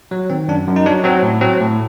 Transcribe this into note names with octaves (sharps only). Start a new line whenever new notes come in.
F#3
D#3 C4
F#2 D4
F#2
D#4
F#3 D4
F#3 C4
A2
F#3 C4
A2